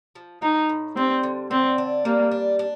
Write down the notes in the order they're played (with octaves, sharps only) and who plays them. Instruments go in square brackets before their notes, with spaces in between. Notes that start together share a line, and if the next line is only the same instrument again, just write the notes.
[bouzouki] F3
[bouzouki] F3 [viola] D#4
[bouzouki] A2
[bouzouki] G3 [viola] C4
[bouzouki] D3
[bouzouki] D3 [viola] C4
[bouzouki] D4
[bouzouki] G3 [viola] A#3
[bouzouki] D4
D4